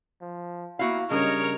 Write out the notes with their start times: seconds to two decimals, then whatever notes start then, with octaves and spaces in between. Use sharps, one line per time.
0.22 F3
0.79 A#3 E4 F#4 F5
1.11 C#3 G3 D4 G#4 A#4 C#5 D#5